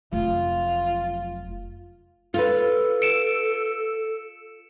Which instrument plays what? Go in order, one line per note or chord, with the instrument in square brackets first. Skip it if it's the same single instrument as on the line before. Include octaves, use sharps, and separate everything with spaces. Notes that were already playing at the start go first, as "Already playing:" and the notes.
[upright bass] F1 F#3 [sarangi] F4
[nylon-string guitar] F4 B4 [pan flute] A4
[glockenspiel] C#7 D7 E7